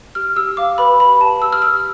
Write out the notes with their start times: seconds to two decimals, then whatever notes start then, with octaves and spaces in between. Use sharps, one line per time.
0.15 G4 F6
0.36 G4 E6
0.57 F5 D6
0.78 B4 B5
0.99 G4 B5
1.20 G4 A5
1.42 G4 E6
1.53 F6
1.62 G4 E6